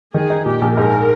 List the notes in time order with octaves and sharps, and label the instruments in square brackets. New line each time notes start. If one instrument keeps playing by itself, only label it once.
[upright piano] D#3 [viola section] G#4
[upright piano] D#4
[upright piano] A#2 [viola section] G4
[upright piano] A#1
[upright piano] G#2 [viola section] A#4